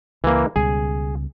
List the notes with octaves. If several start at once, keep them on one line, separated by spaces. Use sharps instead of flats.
C#2 E3 A#3
C#2 B2 G3 G#4